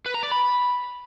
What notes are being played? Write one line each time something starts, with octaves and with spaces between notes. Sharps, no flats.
B4
A#5
D5
B5